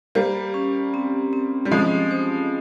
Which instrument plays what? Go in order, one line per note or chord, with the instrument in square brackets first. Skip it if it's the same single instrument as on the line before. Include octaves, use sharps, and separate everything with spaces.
[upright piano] G3 A#3 [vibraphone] C5
[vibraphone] C#4
C4
C4
[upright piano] G3
[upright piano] F3 G#3 [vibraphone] C#4
[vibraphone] C5